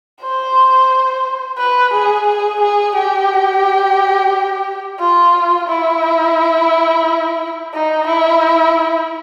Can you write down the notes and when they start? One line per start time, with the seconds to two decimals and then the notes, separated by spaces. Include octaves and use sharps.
0.22 C5
1.59 B4
1.93 G#4
2.27 G#4
2.60 G#4
2.95 G4
5.00 F4
5.69 E4
7.74 D#4
8.07 E4